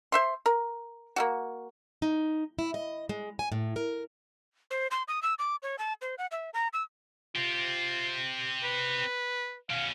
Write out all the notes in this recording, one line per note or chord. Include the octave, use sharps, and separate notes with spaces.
C5 E5 C6
A#4
A#3 C#4 F#4
D#4
E4
D#5
G#3
G#5
A2
A#4
C5
C6
D#6
E6
D6
C#5
A5
C5
F#5
E5
A#5
E6
C4 F4 G4
B4
B2 C#4 F5